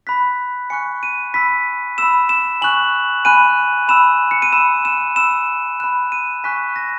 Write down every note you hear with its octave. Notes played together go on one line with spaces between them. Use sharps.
B5 F#6 B6
G#5 C#6 F#6 C#7
D#7
B5 E6 B6
B5 E6 E7
E7
G#5 C#6 F#6 F#7
G#5 B5 F#6 D#7
B5 E6 E7
C#7
D#7
B5 E6 E7
E7
B5 E6 E7
B5 F#6 E7
D#7
G#5 C#6 F#6 B6
A#6